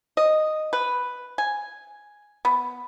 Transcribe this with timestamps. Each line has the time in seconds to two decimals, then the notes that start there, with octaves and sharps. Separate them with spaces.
0.17 D#5
0.73 B4
1.38 G#5
2.45 B3